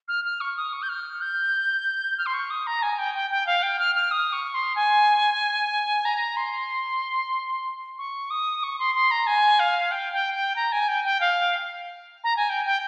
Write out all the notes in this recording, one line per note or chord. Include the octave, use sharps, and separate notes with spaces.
F6
F6
C#6
D#6
C#6
G6
F6
G6
F6
C6
C#6
D#6
A#5
G#5
G5
G5
G5
F5
G5
F6
F6
D#6
C#6
C6
G#5
A#5
C6
C#6
D#6
C#6
C6
C6
A#5
G#5
F5
G5
G5
G5
A#5
G#5
G5
G5
F5
A#5
G#5
G5
G5